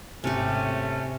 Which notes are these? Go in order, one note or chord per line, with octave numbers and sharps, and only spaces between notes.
G#1 C3 A3 C#4 G4